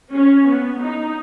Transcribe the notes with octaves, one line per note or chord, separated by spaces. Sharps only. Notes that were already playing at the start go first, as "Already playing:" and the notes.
C#4
B3
D#4